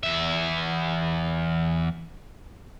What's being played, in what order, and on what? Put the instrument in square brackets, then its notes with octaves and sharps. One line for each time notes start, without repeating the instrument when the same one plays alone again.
[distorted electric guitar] E2 E5